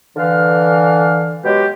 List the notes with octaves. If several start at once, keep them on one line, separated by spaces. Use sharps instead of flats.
D3 E3 F5
B2 F#3 G#3 G4